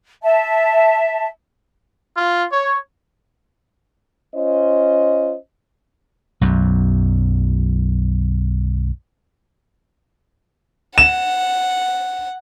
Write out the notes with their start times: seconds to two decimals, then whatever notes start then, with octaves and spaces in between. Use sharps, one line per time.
0.23 E5 A5
2.17 F4
2.52 C#5
4.35 C#4 F4 C5 D#5
6.41 B1 F#2
10.98 F#5 E7